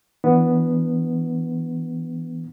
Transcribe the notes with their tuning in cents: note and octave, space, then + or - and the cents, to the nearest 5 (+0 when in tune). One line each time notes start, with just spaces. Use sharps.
E3 +0 B3 +0 D4 +0